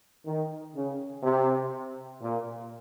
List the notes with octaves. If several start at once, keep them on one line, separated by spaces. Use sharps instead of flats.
D#3
C#3
C3
A#2